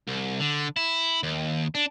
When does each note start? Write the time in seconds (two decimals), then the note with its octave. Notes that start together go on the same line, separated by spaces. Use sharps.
0.07 C2
0.40 D3
0.76 E4
1.23 D#2
1.75 D4